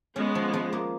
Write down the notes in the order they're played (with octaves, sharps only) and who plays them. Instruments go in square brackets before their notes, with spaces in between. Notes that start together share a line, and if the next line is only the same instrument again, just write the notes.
[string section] G#3 B3 [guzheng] C#4
[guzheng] F3
F3
A#3